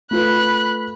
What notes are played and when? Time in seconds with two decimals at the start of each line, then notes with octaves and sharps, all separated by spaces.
0.11 A3 F4 B4 B5 F#6